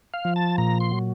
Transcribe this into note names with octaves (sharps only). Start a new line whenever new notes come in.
F5
F3
A5
A#2 A#5
C6
F#3